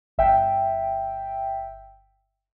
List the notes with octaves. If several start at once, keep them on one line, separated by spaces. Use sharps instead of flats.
G1 E5 G5